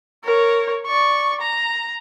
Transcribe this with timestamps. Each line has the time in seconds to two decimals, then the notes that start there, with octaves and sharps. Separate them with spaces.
0.24 A#4 C#5
0.86 D5 C#6
1.41 A#5